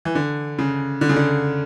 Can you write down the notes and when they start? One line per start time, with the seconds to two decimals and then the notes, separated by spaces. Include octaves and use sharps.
0.05 E3
0.15 D3
0.59 C#3
1.01 D3
1.09 C#3
1.16 D3